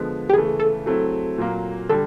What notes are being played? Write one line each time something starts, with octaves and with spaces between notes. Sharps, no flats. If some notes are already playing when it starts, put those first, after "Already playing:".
Already playing: D3 F3 G#3 B3
G4
C#3 E3 A3 G#4
A4
F#3 A3 C4 E4
A#2 F#3 A#3
D3 G3 A4